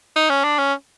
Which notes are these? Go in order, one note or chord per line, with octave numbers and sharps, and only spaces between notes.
D#4
C#4
D4
C#4